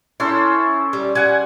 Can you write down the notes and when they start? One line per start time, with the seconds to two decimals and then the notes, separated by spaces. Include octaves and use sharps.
0.20 C#4 E4 A4 C5
0.93 G3
1.15 G3 F#5 G#5